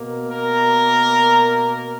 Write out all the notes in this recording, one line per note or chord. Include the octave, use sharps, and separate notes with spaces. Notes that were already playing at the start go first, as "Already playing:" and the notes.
Already playing: B2 A#3
A#4